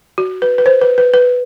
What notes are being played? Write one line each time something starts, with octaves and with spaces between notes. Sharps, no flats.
F#4
B4
B4
C5
B4
B4
B4